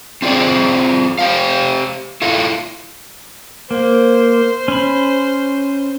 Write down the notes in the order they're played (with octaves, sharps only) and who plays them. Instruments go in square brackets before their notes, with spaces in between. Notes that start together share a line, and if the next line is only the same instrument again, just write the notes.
[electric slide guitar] C4 F4 G#4 C5 D5
G4 C5 F5
E4 F4 A4
[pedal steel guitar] A#3 [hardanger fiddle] C5
[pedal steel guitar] C#4 B5